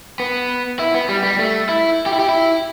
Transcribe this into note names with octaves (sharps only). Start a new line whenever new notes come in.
B3
E4
B3
G3
G3
A3
E4
G4
E4
G4
E4